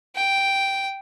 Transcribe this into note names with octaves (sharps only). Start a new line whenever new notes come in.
G5